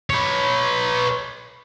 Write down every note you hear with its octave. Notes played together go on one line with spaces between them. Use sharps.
B4 C#5